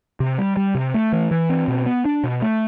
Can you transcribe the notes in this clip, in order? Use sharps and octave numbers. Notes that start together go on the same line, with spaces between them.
C3
G3
G3
C3
A3
E3
E3
C4
B2
B3
D4
B2
A3